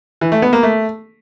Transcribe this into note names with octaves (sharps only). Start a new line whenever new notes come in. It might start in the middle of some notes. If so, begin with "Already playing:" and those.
E3
A3
B3
A#3
A3